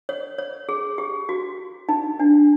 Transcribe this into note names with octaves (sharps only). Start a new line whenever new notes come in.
C#5
C#5
G#4
G4
F#4
D#4
D4